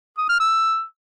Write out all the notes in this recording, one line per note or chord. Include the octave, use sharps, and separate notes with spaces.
D#6
F6
E6